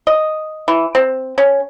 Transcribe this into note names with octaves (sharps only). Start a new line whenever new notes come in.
D#5
E3
C4
C#4